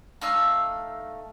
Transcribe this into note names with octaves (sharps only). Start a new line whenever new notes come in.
A3 D#4 F5 E6